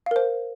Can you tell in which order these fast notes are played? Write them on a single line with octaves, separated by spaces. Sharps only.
F5 A#4 C5